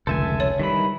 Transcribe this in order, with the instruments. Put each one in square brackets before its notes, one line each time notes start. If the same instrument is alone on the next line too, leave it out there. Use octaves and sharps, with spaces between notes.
[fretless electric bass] F1 C#2 [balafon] D3 [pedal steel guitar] A4 E5 G#5
[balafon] C#5
[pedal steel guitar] D#3 E3 B5 [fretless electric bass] G3